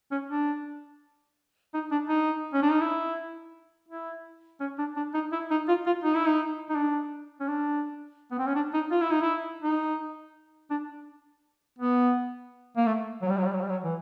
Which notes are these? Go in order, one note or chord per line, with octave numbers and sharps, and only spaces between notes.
C#4
D4
D#4
D4
D#4
C#4
D4
D#4
E4
E4
C#4
D4
D4
D#4
E4
D#4
F4
F4
D#4
E4
D#4
D#4
D4
C#4
D4
B3
C4
C#4
D4
D#4
F4
E4
D#4
E4
D#4
D4
B3
A#3
A3
F#3
G3
F#3
G3
F#3
G3
F#3
E3